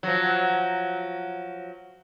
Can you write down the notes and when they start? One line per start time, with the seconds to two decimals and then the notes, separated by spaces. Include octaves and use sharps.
0.03 F3 F#3